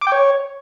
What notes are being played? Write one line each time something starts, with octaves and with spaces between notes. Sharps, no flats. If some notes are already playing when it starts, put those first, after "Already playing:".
D6
G5
C#5